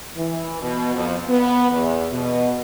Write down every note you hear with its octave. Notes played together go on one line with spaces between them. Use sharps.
E3
B2
F2
B3
E2
B2